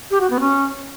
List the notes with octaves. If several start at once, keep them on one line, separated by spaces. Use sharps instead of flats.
G4
F#4
B3
C#4